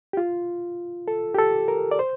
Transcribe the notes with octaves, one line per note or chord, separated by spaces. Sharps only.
G4
F4
A4
G4
A4
A#4
D5
C5